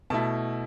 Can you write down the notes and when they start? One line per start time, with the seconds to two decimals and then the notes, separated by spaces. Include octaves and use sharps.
0.10 B2 A3 E4 A5